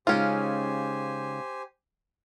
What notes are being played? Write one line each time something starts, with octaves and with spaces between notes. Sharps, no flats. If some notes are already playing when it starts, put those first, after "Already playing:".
C#3 G#3 C#4 D#4 F4 G4 C5 G#5